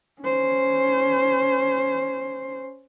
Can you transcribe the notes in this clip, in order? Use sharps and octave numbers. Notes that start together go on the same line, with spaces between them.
C#4 C5